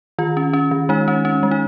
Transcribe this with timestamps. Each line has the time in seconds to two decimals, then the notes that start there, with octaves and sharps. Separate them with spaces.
0.19 D#3 F4
0.37 C#4
0.53 C#4
0.71 D#3
0.89 G#3 D#4
1.08 C#4
1.25 C#4
1.43 G#3
1.51 D#4